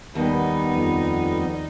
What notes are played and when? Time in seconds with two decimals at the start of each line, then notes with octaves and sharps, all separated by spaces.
0.15 D#2 G3 B3 D#4
0.75 F2